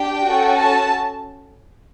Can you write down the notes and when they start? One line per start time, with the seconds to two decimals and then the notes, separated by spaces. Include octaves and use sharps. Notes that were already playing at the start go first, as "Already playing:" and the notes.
Already playing: D4 G4 G5
0.28 C#4 F#4 A4
0.57 A5